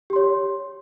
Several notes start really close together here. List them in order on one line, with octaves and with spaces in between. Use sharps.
G4 C6 C#5